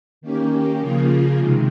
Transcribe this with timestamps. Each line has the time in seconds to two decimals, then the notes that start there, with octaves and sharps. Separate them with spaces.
0.21 D#3 A#3 C#4 G4
0.80 C#3 F3 A#3 F4 G#4
1.38 C3 D#3 G#3